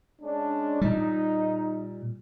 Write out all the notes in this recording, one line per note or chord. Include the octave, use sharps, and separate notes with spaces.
G#3 C#4 D4
A#2 G3 D#4